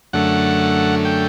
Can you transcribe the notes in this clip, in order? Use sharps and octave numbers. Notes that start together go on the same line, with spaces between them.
F#2 D3 A3 F#5
G5